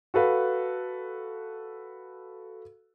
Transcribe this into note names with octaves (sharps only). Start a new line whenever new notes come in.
F#4 A4 B4 F5